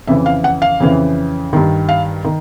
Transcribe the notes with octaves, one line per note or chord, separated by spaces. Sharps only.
F2 C#3 E3 E5
F5
F#5
F5
F2 C#3 E3
G2 D#3
F5
D#3